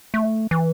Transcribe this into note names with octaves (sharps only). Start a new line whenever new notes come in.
A3
E3